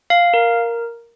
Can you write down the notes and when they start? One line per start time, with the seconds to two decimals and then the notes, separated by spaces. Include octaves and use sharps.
0.10 F5
0.34 A#4